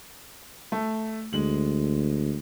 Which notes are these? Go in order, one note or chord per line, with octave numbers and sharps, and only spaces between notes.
A3
D2 G#3 F#7